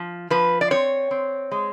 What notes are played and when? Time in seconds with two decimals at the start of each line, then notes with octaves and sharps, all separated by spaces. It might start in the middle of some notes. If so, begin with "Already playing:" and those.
Already playing: F3
0.30 F3 B4
0.61 D5
0.70 C4 C#5
1.11 C4
1.51 G#3